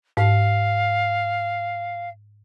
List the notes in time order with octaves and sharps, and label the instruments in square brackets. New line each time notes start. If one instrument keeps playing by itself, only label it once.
[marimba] G#2 [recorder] F5